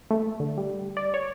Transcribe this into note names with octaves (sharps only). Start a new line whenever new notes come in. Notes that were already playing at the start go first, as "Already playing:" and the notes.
A3
D3
G3
D5
C#5